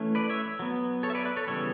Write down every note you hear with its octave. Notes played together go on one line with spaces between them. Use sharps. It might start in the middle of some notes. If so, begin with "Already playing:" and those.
Already playing: E3 A3 C#4
B4 D5
C#5 E5
F#3 B3
A4 C#5
E5
B4 D5
B4 D5
A4 C#5
C#3 E3 G3 B3 A4 C#5